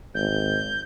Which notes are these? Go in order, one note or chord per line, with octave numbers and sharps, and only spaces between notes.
G#1 G6